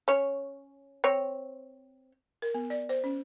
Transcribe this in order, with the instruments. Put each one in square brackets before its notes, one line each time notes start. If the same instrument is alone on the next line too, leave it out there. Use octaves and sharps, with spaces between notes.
[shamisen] C#4 C#5
C4 C#5
[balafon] A#4
B3
D5
C5
C#4